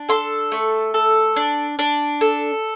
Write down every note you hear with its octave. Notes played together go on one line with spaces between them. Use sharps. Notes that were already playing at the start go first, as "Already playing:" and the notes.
Already playing: D4
A4 C6
A3
A4
D4
D4
A4